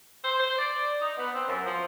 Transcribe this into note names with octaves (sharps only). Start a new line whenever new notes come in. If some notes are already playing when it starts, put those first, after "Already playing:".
C5
C5
D5
D#4
B3
C4
F#2
F3